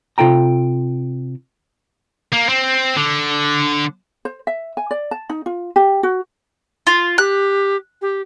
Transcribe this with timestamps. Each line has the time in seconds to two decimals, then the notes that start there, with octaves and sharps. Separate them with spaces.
0.18 C3 F4 A4 G5 A#5
2.32 A#3
2.48 C4
2.97 D3
4.25 C5
4.47 E5
4.77 G#5
4.91 D5
5.11 A5
5.29 D#4
5.46 F4
5.76 G4
6.03 F#4
6.87 F4
7.18 G4 F#6
8.02 G4